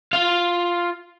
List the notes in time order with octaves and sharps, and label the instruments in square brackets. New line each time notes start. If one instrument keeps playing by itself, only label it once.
[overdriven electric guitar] F4 F5